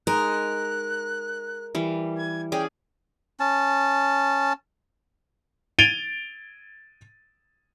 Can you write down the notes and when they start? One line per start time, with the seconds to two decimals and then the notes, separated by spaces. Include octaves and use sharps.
0.07 G#3 D#4 A#4 F#6
1.75 E3 G3
2.17 G#6
2.52 C#4 G#4 D5 G5
3.40 C#4 A5
5.79 G#6 A6 D7 D#7 F7 G7